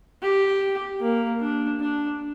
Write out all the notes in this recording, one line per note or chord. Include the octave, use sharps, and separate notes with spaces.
G4
A#3
D4
D4